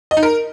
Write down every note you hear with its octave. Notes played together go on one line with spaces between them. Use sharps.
D#5
D#4
A#4